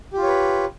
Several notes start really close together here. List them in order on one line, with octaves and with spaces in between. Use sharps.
G4 F4 C#5 B4